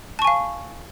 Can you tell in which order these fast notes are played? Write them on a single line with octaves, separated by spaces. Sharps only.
A5 C#6 G#5 F5